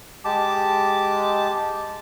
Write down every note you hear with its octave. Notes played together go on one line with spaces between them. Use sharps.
G#3 G4 A5 D6